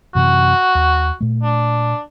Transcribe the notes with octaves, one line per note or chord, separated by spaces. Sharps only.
F#2 C3 E3 F#4
D#2
A#2 A3
D4